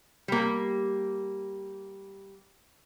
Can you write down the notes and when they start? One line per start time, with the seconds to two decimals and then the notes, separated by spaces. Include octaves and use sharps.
0.28 G3 A#3